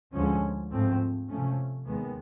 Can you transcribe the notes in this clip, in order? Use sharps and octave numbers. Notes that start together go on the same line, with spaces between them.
D2 D3 F3 G#3 C#4
G#2 F3 A3 C4
C3 F3 A3 C#4
D#2 D#3 G#3 B3